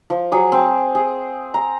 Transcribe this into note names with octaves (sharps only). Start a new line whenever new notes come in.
F3
F#3 G#4 D6
C4
G#4
A#5